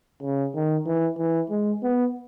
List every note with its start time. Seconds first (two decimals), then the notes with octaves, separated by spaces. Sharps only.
0.23 C#3
0.55 D#3
0.86 E3
1.18 E3
1.50 G#3
1.83 B3